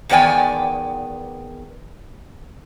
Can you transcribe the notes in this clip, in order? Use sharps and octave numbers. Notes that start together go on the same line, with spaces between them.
E2 D#3 B3 D5 G5 G#5